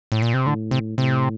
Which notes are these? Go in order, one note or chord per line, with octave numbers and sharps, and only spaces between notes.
A2
A#2
C3
A2 D3
C3
A2 C3